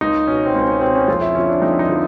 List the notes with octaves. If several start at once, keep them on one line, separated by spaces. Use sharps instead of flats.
C#2 D#4
B2 C#4
C4
C#2 C#4
C#4
B2 C4
C#4
F2 F4
E4
D3 F3 C#4
D4
F2 D#4
E4
D#4
D3 F3